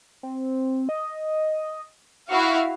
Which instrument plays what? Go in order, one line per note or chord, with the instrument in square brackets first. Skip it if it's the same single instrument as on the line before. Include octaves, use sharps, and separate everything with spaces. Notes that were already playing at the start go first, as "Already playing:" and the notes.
[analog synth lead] C4
D#5
[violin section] E4 F#4 F5 [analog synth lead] C#6